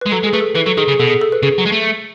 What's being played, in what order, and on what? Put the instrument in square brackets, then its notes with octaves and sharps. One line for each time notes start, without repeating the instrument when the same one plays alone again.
[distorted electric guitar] G#3 [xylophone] B4
[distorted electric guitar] F#3 [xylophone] A4
[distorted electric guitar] G#3
[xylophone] G#4
[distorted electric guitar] A3 [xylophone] B4
[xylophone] A4
[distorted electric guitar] E3 [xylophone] B4
[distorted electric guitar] F#3 [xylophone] A4
[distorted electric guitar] D#3 [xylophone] G#4
[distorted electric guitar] C#3 [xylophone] G#4
[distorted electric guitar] B2 [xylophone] A4
[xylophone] G#4
A4
B4
[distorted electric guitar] C#3 [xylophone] G#4
[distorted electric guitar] F#3
G#3
A3